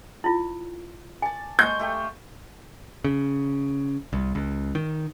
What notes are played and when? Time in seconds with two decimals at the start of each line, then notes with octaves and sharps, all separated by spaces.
0.24 E4 F4
1.22 D5 G#5 A5
1.59 G#3 C#6 G6
1.79 A3 G4 F5
3.04 C#3
4.13 C2
4.35 C#2
4.75 D#3